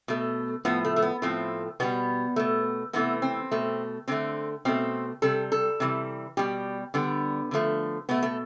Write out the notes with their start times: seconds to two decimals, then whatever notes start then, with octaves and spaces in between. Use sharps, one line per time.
0.08 B2 A3
0.65 A2 F3 A3 B3
0.85 A3
0.96 A3
1.02 B3
1.22 A2 F3 A3 C4
1.80 B2 G3 B3
2.36 B2 A3
2.93 C3 E3 A3 B3
3.22 C4
3.51 B2 A3
4.08 D3 A3 C4
4.65 B2 A3 C4
5.22 C3 G3 A4
5.52 A4
5.80 C3 E3 G3
6.37 B2 G3 G4
6.94 D3 G3 B3
7.51 D3 F3 A3
8.09 B2 A3 B3
8.23 A3